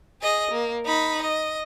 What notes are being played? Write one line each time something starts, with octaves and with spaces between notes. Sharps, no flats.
G#4 D#5
A#3
D#4 B5
D#5